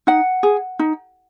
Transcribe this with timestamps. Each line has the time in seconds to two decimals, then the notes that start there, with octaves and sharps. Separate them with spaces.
0.07 D#4 F#5
0.43 G#4
0.79 D#4